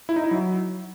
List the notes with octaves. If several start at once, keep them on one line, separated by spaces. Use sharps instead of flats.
E4
D#4
E4
F#3